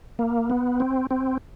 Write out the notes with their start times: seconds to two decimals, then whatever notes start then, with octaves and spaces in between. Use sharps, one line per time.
0.19 A#3
0.50 B3
0.80 C4
1.11 C4